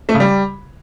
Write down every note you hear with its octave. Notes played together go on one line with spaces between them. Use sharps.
A3
C#3
G3